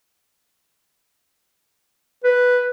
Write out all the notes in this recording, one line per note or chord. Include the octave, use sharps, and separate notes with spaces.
B4